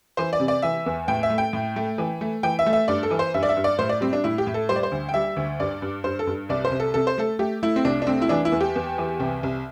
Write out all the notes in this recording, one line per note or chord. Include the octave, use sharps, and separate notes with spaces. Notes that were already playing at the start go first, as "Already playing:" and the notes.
E3 C5
D5
C3
D5
E3 E5
E2
A2 G5
E5
A3
G5
A2
A3
E3
A3
E3 G5
E5
A3
E5
G2 D5
A4
E3
C5
G2 E5
D5
E5
G2
D5
A2 C5
D5
G3 C4
D4
A2 E4
G4
A2
A4
G3 C5
D5
C5
D2
G5
G3 E5
D2
G2 D5
G2
G2 C5
A4
G2
C2 D5
C5
C2
A4
C3 A4
C5
A3 A4
A3 G4
A3 E4
C4
C2 D4
D4
A3 C4
E4
E3 D4
E4
E2
G4
E2
E3
C2
C2